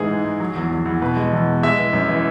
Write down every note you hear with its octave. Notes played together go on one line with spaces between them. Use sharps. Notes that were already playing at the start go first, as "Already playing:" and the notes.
Already playing: G#2 E3 G#3 G#4
G#2
G#2
F#3
E2
E2
E2
B2 B4
G#3
E2
B2
G#3 E5
E3
F#2
E3